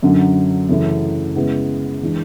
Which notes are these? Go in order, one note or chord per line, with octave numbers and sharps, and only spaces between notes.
F#2 D3 F#3
F#2 C#3 E3 A3 E4
C#3 G#3 B3 E4
E3 G#3 D4